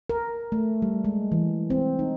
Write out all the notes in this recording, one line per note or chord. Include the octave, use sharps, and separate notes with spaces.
A#4
A3
G3
G#3
E3
C4
D#4